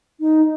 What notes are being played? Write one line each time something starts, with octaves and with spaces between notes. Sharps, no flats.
D#4